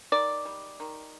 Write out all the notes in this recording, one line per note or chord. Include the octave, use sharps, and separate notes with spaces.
D#3 D5
G3
D#3